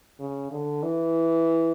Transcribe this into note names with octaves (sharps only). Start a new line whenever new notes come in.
C#3
D3
E3